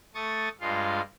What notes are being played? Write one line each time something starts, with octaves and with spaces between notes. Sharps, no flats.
A3 C#6 D#6 A6
G2 G#3 F4 F5